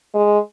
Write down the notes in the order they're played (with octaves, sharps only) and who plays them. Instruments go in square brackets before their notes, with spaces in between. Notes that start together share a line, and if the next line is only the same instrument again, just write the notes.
[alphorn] G#3